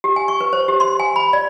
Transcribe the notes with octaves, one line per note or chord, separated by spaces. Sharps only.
G4
G#5
C#6
B4
C5
G4
C6
G#5
B5
D5